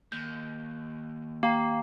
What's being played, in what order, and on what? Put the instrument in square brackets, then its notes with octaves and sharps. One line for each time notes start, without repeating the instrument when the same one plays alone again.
[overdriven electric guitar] D#2 [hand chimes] G6
[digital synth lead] A#3 [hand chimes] G4 G5 A#5